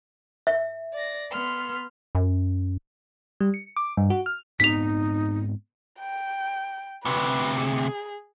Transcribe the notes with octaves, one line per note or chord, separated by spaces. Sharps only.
E5
D5 A#6
B3 C6 F6
F#2
G3
C#7
D6
G2
F#4
F6
G#2 B3 C4 D#4 B6 F7
G5
D2 C3 B4
G#4